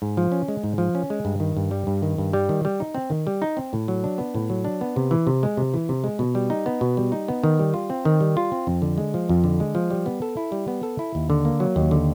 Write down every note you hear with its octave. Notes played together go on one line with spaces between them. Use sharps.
G#2
F3
C#4
G#3
G#2
F3
C#4
G#3
G2
D#3
G2
G3
G2
D#3
G2
G3
D#3
G3
D#4
C4
D#3
G3
D#4
C4
A2
F#3
D4
B3
A2
F#3
D4
B3
C3
E3
C3
G#3
C3
E3
C3
G#3
B2
G3
D#4
B3
B2
G3
D#4
B3
D#3
G3
F4
C4
D#3
G3
F4
C4
F2
D3
G#3
F3
F2
D3
G#3
F3
G3
B3
A4
E4
G3
B3
A4
E4
D#2
D3
A#3
F#3
D#2
D3